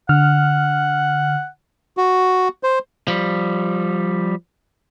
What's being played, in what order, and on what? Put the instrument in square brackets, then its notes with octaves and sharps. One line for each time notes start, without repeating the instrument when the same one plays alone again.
[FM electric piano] D3 F6 [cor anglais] F#5
[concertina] F#4
C5
[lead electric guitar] F3 G3